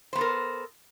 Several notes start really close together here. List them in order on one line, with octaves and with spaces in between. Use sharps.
C5 B3 A4 A#4